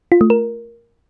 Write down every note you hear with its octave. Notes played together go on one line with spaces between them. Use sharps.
F4
A3
A#4